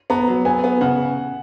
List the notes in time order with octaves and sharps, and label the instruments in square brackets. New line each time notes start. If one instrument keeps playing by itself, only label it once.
[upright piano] B3 [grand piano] A#5
[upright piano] F#3
[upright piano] B3 [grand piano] G#5
[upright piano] B3
[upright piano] C#3 [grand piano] F#5